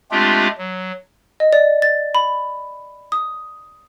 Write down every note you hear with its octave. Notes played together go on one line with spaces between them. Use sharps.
G#3 A3 C4 D4 F4 G4
F#3
D#5
D5
A6
B5
D#6